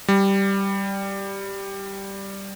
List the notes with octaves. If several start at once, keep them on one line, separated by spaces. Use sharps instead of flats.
G3